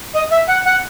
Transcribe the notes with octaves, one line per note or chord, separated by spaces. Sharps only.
D#5
E5
F#5
F#5